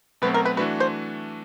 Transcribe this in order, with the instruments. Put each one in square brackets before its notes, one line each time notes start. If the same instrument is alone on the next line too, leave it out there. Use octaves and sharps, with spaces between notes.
[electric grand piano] B2 F#3 A3 C4 [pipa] B4
[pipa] A#4
B4
[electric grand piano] E3 A3 D4 F#4 [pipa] B4
[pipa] C5